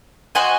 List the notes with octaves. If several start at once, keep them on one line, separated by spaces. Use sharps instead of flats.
F#4 C5 D#5 G#5